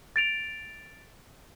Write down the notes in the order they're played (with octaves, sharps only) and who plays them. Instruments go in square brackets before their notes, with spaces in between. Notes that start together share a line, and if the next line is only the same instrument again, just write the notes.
[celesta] A6 D7 F7